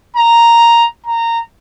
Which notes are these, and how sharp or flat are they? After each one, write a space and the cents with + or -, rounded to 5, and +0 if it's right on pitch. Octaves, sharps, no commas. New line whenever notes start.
A#5 +0
A#5 -15